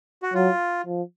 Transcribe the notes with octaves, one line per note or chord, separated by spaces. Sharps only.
F#4
F#3 F4
F3